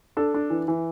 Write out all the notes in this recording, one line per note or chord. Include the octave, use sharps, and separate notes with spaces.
D4 A4
D4
E3
E3